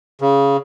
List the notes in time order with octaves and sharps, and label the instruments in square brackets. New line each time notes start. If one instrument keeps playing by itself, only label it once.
[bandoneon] C#3